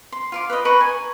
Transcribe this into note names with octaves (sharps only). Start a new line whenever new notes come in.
C6
F4 C6 D6
B4 C#5 D#5
B4 A#5 C#6
G#5